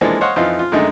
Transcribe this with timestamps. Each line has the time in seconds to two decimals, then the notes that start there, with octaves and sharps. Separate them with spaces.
0.01 E3 F3 G#3 A#3 D4 A4
0.21 C5 C#5 D#5 F5 F#5
0.36 F2 E3 D#4 F4 F5
0.59 F4
0.72 F#2 D3 D#3 G#3 A3 D#4